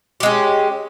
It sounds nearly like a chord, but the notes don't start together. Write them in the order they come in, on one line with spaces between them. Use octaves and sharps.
G4 G#3 C#4